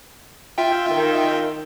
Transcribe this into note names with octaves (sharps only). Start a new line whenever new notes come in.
F4 E5 G5
D#3